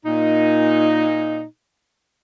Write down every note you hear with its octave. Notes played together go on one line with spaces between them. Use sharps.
A#2 D#4